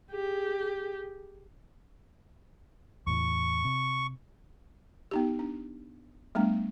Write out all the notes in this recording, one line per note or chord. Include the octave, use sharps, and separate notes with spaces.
G4 G#4
E2 A2 E3 C#6
C3
B3 D#4 G4
D4
G3 A3 B3 D4